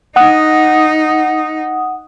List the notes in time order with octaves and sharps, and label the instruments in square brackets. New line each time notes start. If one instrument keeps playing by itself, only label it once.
[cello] D#4 [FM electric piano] F#5 D#6